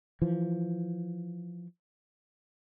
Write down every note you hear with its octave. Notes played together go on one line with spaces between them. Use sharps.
E3 F3